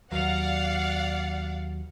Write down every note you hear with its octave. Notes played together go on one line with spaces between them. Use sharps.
D#2 F#3 D5 F5 F#5